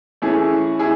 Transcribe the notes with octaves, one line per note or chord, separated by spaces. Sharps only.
E3 A3 C#4 E4 G#4
E4 G#4